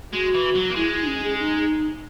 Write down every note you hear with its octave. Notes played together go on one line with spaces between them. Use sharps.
G#3 F#4
E3
F#3
A#3
G#3 E4
D#4
C#4
G#4
D#4